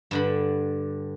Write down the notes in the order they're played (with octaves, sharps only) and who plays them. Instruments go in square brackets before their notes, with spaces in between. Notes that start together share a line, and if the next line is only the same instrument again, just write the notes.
[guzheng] G2 D3 B5